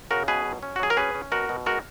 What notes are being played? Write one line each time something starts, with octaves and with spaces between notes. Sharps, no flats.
C#3 F#4 A#4
B2 G#4 B4
F#3
C#4
F#4
F#3 G#4
A#4
C#4 G#4 B4
C#4
B2 F#4 A#4
B2
G#3 F#4 A#4